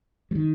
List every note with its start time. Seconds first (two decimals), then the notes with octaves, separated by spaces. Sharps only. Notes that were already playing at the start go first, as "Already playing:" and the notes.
0.31 F#3
0.35 D#3